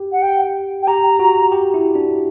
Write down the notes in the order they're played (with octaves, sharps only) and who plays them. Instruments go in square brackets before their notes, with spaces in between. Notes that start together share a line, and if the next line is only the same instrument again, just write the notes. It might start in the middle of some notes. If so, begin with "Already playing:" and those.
Already playing: [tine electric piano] G4
[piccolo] F#5
G5
G5
[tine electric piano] G4 [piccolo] A#5
[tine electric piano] F#4
G4
E4
D4